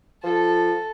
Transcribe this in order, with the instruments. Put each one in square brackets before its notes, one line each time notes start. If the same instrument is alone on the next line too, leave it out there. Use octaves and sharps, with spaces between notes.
[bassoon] F3 [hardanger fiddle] A4